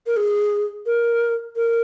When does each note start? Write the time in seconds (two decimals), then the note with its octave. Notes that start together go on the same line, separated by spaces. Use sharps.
0.06 A#4
0.16 G#4
0.86 A#4
1.56 A#4